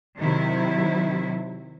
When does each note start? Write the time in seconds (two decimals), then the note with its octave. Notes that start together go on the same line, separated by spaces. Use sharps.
0.17 C3 D#3 F#3 E4